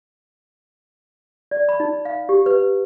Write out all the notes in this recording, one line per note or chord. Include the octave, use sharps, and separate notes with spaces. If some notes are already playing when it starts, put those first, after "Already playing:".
D5
B5
D#4
F5
G4
B4